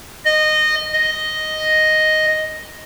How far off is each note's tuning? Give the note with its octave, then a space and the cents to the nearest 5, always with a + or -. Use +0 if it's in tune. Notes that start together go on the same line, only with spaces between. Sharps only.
D#5 -15
D#5 +0